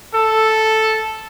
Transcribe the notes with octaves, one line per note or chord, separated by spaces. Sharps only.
A4